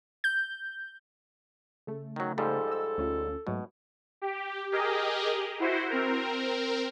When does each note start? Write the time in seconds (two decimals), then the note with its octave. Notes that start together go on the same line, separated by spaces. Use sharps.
0.24 G6
1.87 C#3 A3
2.16 D#3 F#3
2.38 G#2 F3 G3 A4
2.68 D#5 E6
2.98 D2 C#4 F4
3.47 G#2 B2 F#3 A3
4.22 G4
4.72 G4 G#4 A#4 D#5
5.60 E4 F#4 C5
5.90 C4 A#4